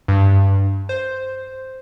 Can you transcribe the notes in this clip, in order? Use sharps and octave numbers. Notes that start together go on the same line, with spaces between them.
G2
C5